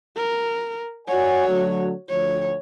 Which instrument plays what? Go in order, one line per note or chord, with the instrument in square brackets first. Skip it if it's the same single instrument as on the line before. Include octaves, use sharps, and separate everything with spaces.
[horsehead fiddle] A#4
[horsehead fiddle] F#4 C#5 [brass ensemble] D5 F#5 G#5
[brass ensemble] D3 F#3 A3
[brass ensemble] D2 F3 [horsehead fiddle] C#5